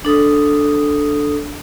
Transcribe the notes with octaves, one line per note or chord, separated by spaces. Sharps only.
D4 A4 D#6